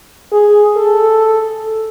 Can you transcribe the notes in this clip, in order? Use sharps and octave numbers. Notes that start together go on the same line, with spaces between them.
G#4
A4